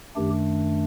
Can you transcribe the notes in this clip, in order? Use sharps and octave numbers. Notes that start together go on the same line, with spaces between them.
F#2 D#3 A3 D4 G4